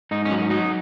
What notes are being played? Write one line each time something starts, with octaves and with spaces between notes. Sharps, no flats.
G#2 D#4
C#4
F#3
C#4
F#3 D#4